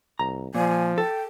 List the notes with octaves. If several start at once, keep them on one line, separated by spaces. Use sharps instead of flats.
C2 A#5
A#2 F3 G#5
A4 G5